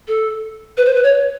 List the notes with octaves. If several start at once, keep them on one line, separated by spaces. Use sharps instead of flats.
A4
B4
C5
B4
C#5